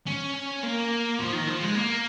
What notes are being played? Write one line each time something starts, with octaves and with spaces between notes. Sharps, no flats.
C#4
A#3
F3
D#3
F3
G#3
A#3